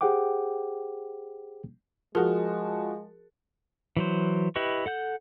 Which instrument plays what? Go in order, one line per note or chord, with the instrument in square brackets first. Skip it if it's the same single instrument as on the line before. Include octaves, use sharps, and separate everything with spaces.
[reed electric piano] G4 G#4 C5 F#5 G5 D6
[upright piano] F3 F#4 [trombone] G#3 [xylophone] G#4 A#4
[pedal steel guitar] E3 F#3 C5
E4 G4 B4 D#5 C#6
A4 F#5 G6